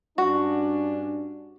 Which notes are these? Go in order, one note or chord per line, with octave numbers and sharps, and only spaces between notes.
G2 C#4 D4 F#4